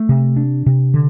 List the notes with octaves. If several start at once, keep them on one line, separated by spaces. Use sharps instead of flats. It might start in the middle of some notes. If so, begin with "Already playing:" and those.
Already playing: A3
C3
D4
C3
D3